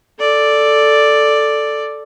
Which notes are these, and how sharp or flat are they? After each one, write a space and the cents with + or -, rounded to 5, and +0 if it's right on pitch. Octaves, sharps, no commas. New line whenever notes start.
A4 +0 D5 +0